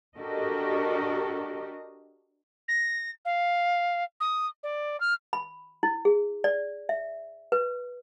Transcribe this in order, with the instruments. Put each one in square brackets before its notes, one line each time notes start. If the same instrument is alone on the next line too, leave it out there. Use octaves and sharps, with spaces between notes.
[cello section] D4 F#4 G4 A4 A#4 D#5
[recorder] A#6
F5
D#6
D5
F6
[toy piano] B5
E4
G#4
D5
E5
B4